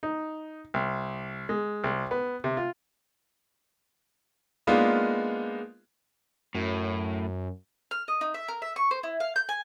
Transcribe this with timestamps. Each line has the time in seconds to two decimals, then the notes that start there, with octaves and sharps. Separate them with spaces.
0.03 D#4
0.74 C2
1.49 G#3
1.84 C2
2.11 B3
2.44 C3
2.57 F4
4.67 G#3 A#3 B3 D4 D#4 F4
6.55 F#2 A2
7.91 F6
8.08 D#5
8.21 D#4
8.34 E5
8.48 A#4
8.62 E5
8.76 C#6
8.91 C5
9.03 E4
9.20 F5
9.36 G6
9.49 G#5